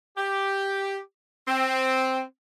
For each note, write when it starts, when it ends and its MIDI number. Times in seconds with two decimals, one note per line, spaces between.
0.17 0.99 67
1.48 2.21 60